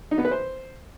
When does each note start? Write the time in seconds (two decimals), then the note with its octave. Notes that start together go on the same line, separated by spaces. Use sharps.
0.11 D#4
0.18 B3
0.25 B4
0.31 C5